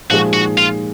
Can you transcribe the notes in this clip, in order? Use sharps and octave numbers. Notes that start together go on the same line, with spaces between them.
A#2 F3 G#3 D#4 F#4 G#4
F#4
F4